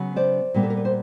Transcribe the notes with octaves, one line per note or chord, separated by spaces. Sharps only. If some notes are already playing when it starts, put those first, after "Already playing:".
Already playing: C#3 F#3 B3
C5 D5
A#2 G3 B3
A4
A#4
B4
C5